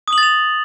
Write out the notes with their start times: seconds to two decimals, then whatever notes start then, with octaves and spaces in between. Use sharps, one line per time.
0.08 D#6
0.13 F#7
0.18 A6
0.23 F7